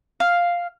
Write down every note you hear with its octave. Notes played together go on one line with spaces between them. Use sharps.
F5